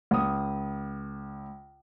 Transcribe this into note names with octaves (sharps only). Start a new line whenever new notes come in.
C#2 D#6